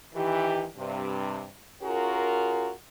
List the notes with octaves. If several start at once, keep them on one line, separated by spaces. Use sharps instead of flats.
D#3 E3 G4
G2 C3
C#4 F4 F#4 G#4 A#4